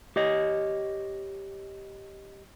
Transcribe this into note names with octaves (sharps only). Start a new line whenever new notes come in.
G4 C#5 D#5